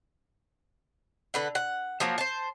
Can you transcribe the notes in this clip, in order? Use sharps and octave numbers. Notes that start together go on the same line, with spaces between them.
D3 B4 F#5
F#5
F3 F#3 A#3
C5 A5